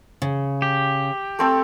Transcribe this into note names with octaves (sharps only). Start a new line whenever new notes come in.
C#3
G4
A3 C4 A4